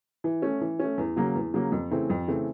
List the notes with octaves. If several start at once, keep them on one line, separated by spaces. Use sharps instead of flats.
E3
A3 C#4
E3
A3 C#4
E2
C#3 F#3 A#3
E2
C#3 F#3 A#3
F2
C#3 E3 A3 C4
F2
C#3 E3 A3 C4